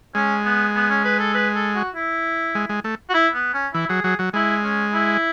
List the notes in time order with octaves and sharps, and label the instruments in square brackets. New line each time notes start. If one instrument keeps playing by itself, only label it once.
[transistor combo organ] G#3 [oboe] C#4
[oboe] B3
B3
C#4
B4
A4
B4
A4
F#4
E4
[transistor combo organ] G#3
G#3
A3
[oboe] F#4
E4
B3
C#4
[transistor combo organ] E3 [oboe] E4
[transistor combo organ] F#3 [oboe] G#4
[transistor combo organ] F#3 [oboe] G#4
[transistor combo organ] F#3
[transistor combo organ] G#3 [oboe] E4
[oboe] C#4
E4